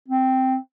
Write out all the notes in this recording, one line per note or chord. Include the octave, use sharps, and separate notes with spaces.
C4